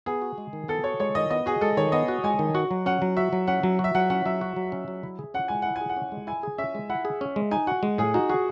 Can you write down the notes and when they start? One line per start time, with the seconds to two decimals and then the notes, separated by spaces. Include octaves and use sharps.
0.06 B3 G#4
0.22 F#4
0.38 G#3
0.53 D#3
0.68 B3 A4
0.84 F#4 C#5
1.00 G#3 C#5
1.15 D#3 D#5
1.30 B3 D#5
1.46 F#4 G#4
1.61 G#3 A4
1.77 D#3 C#5
1.92 B3 D#5
2.08 F#4
2.24 G#3 G#5
2.39 D#3
2.54 F#4 F#5
2.71 F#3
2.86 C#4 F#5
3.02 F#3
3.17 F#4 E5
3.33 F#3
3.47 C#4 F#5
3.63 F#3
3.79 F#4
3.84 E5
3.95 F#3 F#5
4.10 C#4 F#5
4.26 F#3 E5
4.41 F#4
4.56 F#3
4.72 C#4
4.88 F#3
5.03 E4
5.19 G#4
5.34 C#4 F#5
5.48 G#3 G#5
5.62 E4 F#5
5.76 G#5
5.81 G#4
5.89 F#5
5.97 C#4
6.12 G#3
6.27 E4 G#5
6.43 G#4
6.58 C#4 E5
6.75 G#3
6.90 E4 F#5
7.05 G#4
7.21 C#4
7.36 G#3
7.51 D#4 G#5
7.67 F#4 F#5
7.83 G#3
7.98 A2 G#4
8.14 D#4 F#4
8.29 F#4 G#4